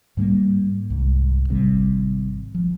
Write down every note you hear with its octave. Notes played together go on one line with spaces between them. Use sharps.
G#2 G3 A3 A#3
C2 G#2
G#1 C3 G3
F3